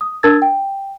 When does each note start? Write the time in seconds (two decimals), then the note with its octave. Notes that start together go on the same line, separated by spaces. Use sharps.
0.01 D#6
0.23 D4 A#4 A5 E6 G#6 A6
0.42 G5